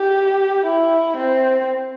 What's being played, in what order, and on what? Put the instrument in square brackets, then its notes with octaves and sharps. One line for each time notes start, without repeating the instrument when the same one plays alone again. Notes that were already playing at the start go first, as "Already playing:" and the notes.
Already playing: [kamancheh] G4
E4
C4